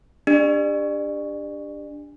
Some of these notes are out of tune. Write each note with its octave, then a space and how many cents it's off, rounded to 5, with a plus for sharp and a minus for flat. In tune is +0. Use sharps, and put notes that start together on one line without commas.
D4 +0 G4 +30 D5 +35